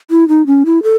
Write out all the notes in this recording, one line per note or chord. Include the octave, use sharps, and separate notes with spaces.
E4
D#4
C#4
E4
A4